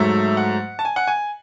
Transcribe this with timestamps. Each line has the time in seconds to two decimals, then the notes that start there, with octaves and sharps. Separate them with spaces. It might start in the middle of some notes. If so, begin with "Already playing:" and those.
Already playing: G#2 F#3 A3 E5
0.37 F#5
0.79 A5
0.85 G#5
0.96 F#5
1.07 G#5